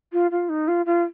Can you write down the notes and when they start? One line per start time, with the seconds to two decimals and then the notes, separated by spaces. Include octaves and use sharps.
0.12 F4
0.31 F4
0.49 D#4
0.67 F4
0.85 F4